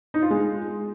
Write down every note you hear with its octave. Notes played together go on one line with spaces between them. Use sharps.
D#4
F4
G#3